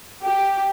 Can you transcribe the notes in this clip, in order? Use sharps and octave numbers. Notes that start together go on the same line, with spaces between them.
G4